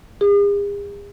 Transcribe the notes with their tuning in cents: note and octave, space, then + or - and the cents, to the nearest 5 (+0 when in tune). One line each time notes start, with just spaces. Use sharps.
G#4 -45